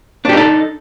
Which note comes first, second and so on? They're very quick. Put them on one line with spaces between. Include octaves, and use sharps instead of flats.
D4 G4 D#4 A4